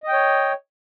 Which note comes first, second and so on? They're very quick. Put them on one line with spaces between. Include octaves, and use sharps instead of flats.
D#5 G5 C#5